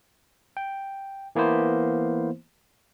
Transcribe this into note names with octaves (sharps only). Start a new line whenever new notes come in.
G5
E3 A#3 B3 E4 C5